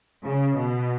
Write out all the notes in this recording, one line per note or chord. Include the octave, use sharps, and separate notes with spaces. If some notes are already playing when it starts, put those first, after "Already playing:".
C#3
B2